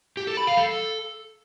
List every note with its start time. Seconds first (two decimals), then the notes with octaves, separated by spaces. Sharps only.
0.17 G4
0.27 A4
0.37 B5
0.47 F5
0.57 A4